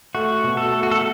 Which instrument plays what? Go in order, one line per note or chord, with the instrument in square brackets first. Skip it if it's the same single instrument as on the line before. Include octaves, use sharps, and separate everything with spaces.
[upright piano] A3 [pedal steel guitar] F#4
[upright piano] B2
[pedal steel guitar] A4
[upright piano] A3
[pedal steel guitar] F#4
A4